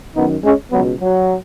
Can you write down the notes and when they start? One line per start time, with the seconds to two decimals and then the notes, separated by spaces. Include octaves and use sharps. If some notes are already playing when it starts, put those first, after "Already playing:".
0.15 F#2 D#3 B3 D#4
0.44 G#3 C#4
0.72 C#2 B2 F#3 B3
1.00 F#3